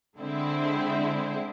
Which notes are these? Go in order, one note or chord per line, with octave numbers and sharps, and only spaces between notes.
D3 G#3 C4 E4